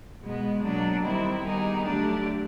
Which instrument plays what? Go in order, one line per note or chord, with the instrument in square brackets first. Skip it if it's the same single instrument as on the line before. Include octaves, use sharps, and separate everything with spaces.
[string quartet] B2 G#3 B3
B2 F#3 A#3 D4
D#3 G3 C4 E4
D#3 G3 B3 D#4 G#4
D3 F#3 A3 D4 G4